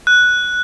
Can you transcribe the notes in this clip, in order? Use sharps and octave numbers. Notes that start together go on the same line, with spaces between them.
F#6